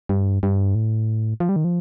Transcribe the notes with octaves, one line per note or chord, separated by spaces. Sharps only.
G2
G2
A2
F3
G3
D#3
F3